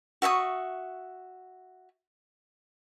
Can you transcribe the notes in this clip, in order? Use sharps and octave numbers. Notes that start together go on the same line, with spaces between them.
F#4 E5 C#6 D#6